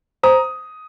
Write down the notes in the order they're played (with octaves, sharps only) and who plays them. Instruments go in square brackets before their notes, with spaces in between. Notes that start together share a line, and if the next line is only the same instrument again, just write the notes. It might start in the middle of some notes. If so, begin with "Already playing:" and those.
[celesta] C5 [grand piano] A#5 D#6